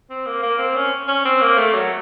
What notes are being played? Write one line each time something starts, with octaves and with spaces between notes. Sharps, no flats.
C4
A#3
A#3
C4
C#4
C#4
C4
A#3
A3
F#3